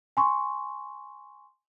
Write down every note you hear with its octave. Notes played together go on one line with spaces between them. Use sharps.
G#5 C6 C#6